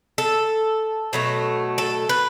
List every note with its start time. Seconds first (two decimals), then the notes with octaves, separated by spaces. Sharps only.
0.18 A4
1.13 B2 F#3 A3
1.78 A4
2.09 B4